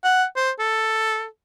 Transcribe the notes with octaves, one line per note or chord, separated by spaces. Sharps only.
F#5
C5
A4